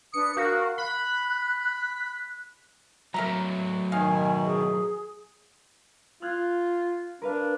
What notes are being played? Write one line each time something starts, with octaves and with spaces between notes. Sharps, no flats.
D4 B4 D#6 C#7
F#4 A#4 F5
B5 F#6
F#3 A3 A#4 E5 A#5
B2 D#3 D#4 F5 G#5
G#4
F4 F6 F#6 G#6
D4 A#4 B4 F5